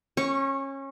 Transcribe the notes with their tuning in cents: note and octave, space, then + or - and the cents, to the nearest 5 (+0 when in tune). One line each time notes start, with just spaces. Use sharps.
C#4 -25 C#6 +0